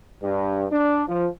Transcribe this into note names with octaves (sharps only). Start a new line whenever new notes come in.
G2
D4
F3